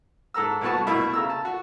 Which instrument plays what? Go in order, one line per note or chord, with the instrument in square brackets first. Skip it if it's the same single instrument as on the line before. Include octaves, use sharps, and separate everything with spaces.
[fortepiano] G#2 A4 A#5 E6
C2 A3 B3 F#4 A5
B2 A3 E4 B4 E5 E6
C#3 A#5 E6
A5
F#4